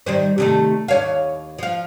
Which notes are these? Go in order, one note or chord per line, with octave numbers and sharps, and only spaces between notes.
D#3 G3 C5
C3 D#3 A3
D#2 C#5 F5
F3 F5